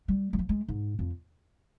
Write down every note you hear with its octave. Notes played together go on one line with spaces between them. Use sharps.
G3
G3
F3
G#3
G#2
F2